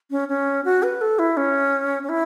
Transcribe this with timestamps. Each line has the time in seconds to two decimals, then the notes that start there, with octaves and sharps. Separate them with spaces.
0.11 C#4
0.28 C#4
0.65 F#4
0.83 B4
1.01 A4
1.19 E4
1.37 C#4
2.03 C#4
2.09 E4